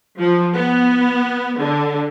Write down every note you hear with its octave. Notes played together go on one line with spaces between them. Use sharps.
F3
B3
D3